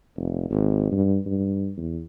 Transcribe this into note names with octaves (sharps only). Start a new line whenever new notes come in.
F1
G#1
G2
G2
E2